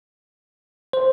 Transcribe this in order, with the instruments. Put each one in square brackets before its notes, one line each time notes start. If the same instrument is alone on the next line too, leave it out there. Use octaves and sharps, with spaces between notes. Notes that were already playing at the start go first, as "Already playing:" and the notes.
[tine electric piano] C5